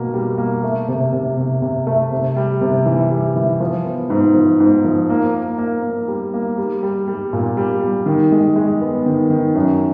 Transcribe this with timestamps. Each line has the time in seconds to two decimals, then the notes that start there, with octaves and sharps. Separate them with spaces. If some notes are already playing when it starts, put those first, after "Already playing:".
Already playing: B2 A#3
0.14 G3
0.38 A#3
0.63 A3
0.88 C3
1.13 C3
1.37 C3
1.62 C3
1.87 A3
2.12 C3
2.36 G3
2.61 C3
2.86 E3
3.11 G3
3.36 E3
3.60 F3
3.85 B3
4.10 G#2
4.34 F3
4.60 G#2
4.85 F3
5.10 A#3
5.34 A#3
5.58 A#3
5.83 A#3
6.08 G3
6.34 A#3
6.58 G3
6.83 G3
7.08 G3
7.33 A#2
7.57 G3
7.81 G3
8.06 D#3
8.32 G#3
8.56 G#3
8.81 B3
9.06 D#3
9.30 D#3
9.55 F#2